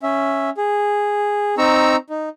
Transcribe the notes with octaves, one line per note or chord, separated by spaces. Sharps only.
C#4 E5
G#4
C4 D#4 A#5 C#6 E6
D#4